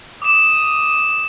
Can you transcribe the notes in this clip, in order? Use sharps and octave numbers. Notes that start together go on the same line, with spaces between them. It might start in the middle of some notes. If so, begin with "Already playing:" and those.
D6 D#6 E7